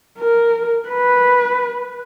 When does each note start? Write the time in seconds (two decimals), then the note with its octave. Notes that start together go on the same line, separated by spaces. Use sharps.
0.19 A#4
0.89 B4